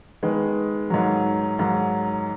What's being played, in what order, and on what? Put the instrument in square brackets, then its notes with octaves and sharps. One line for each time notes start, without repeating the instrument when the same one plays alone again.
[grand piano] D#3 G#3 B3
G#2 D#3 F#3
G#2 D#3 F#3